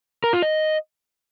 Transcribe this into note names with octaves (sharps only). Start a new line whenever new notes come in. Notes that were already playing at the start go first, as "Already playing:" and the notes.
A#4
F4
D#5